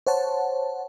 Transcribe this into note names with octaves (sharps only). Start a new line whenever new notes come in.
C5 C#5 F#5 A5